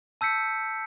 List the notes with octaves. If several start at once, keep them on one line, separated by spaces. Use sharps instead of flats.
A5 E6 G6 B6 C#7